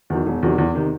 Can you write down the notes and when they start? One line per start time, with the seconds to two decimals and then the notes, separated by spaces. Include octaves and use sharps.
0.10 E2 D#3 F#3
0.26 E1
0.43 E2 C3 D#3 F#3
0.58 E2
0.75 C3 D#3